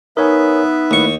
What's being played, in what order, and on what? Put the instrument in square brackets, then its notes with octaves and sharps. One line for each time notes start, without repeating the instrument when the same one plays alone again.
[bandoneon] B3 B4 E5 [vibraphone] D#4 [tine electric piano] A#4 C#5 G#5
[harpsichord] D#2 C#6 [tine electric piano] A3 E4